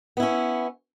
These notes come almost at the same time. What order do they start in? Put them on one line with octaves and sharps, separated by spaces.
B3 E4 C#4